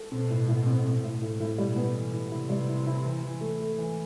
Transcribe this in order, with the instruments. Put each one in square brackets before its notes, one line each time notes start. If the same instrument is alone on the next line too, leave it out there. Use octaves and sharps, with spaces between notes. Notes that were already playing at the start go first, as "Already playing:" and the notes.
Already playing: [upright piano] A4
[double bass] B2 [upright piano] C4
[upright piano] A2
A2
C4
C4
A2
A2
A2
[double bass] B2 [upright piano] G3
[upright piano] B3
E3
E4
[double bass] C3 [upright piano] E4
[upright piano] G3
E4
E4
E3
E3
A3
A3
E3